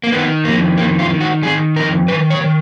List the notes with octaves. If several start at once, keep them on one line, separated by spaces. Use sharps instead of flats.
A#3
D#3 B3
F2 A#3
D#3 A#3
F4
D#3
F#4
D#3 G#4
F2 A#4
D#3 B4
C#5
D#3